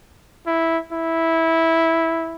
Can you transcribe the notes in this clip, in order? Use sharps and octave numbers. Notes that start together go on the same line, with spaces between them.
E4
E4